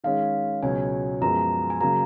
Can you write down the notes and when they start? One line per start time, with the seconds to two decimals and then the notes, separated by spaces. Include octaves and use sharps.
0.04 D#3 G#3 C#4 F5
0.63 C#2 B2 F#3 C#4 G#5
1.21 F#2 F3 G#3 B3 A#5
1.70 G#5
1.81 C#3 F#3 A#3 A#5